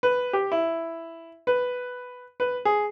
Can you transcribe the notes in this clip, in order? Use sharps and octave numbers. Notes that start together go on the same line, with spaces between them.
B4
G4
E4
B4
B4
G#4